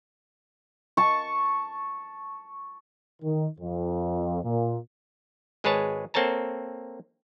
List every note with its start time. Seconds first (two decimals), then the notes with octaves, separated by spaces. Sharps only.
0.97 A5 C#6
3.23 D#3
3.59 F2
4.43 A#2
5.64 G#1 G#3 G#4 B4 C#5 A5
6.14 A#3 C4 A4 C#5 A5 A#5